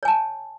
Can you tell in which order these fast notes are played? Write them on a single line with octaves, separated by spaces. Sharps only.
C#5 G#5 A5